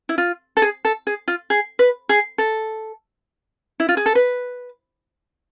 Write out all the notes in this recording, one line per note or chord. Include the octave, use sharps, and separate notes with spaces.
E4
F4
A4
G#4
A4
G#4
F4
G#4
B4
G#4
A4
E4
F4
G#4
A4
B4